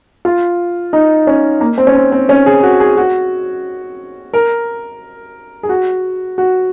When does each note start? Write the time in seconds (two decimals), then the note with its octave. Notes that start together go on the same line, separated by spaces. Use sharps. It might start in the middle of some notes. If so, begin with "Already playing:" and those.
0.25 F4
0.93 D#4
1.27 C#4
1.61 A#3
1.78 C4
1.87 C#4
1.95 C4
2.12 C4
2.29 C#4
2.46 G#4
2.63 F#4
2.80 G#4
2.97 F#4
4.33 A#4
5.63 G#4
5.69 F#4
6.38 F#4